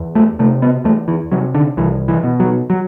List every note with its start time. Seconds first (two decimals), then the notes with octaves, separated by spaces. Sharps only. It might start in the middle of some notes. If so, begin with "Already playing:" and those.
Already playing: E2
0.15 A3
0.39 C3 A3
0.62 B3
0.84 E2 A3
1.08 E3
1.32 C3 F#3
1.55 D3
1.77 C2 E3
2.08 E3
2.24 B2
2.40 F#3
2.70 F#3